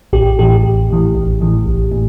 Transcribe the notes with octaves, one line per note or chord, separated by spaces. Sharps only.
A1 G4
A2 E3 G4
A1
A2 E3
A1
A2 E3
A1
A2